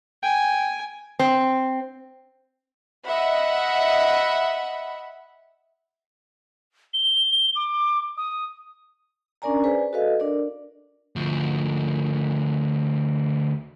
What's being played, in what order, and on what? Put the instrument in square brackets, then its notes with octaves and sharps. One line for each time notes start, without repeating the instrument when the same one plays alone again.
[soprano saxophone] G5 [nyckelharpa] G#5
[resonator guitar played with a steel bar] C4
[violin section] D#5 E5 F#5 B5
[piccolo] G7
D6
D#6
[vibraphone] C#4 D4 A#4 D5 G#5 A#5
G#4 B4 C5 D5 G#5
F#4 A4 B4 D#5 F5
D4 A#4 D5
[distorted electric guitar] D2 F3